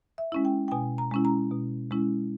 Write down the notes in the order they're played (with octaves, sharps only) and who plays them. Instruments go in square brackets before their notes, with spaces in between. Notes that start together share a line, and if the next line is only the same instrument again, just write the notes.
[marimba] E5
G#3 C#4 E4
G5
G5
B2 G#5
A#5
G#3 C#4 E4
A#5
B2
G#3 C#4 E4